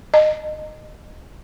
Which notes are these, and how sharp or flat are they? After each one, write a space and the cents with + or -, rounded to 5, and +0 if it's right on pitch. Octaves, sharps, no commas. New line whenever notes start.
D#5 -15